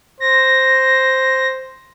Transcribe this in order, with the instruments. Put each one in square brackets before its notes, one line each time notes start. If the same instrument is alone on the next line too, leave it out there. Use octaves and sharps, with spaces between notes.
[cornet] C5 [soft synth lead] A#6